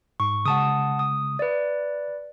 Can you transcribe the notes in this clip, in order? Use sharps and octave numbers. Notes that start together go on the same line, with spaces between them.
G#2 C#6
C#3 G#3 F#5 A5 D#6
D#6
B4 D5 E5